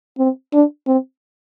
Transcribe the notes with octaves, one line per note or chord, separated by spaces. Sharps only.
C4
D4
C4